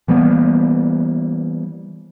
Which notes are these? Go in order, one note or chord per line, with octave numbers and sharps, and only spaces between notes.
E3 G3 A#3 B3